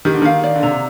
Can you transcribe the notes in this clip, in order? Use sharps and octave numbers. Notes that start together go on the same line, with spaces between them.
D#3 G4
D3
D#3 F5
D5
D3
C3 A#5